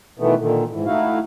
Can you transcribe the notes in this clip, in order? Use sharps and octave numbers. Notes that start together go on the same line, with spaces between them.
B2 D#3 E3 A3 B3
A#2 D3 D#3
G#2 E3
A3 D#4 E4 F#4 F5